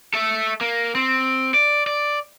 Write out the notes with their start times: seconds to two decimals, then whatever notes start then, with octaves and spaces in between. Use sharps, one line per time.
0.14 A4 E5
0.61 A#3
0.95 C4
1.54 D5
1.87 D5